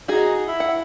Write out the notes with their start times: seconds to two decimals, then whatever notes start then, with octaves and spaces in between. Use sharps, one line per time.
0.08 D#4 F#4 G#4
0.47 E4
0.60 F#5